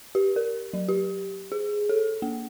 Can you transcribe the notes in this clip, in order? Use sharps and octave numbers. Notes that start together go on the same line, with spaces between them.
G4
A#4
F#3
G4
G#4
A4
A#3